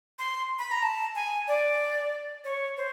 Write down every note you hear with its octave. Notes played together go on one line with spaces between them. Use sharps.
C6
B5
A#5
A5
G#5
D5
C#5
C5